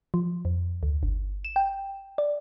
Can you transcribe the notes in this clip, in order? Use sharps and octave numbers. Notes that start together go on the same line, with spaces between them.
F3
F2
D2
G1
E7
G5
D5